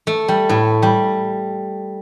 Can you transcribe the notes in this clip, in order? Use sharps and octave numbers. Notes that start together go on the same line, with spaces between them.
A3
G3
A2
G3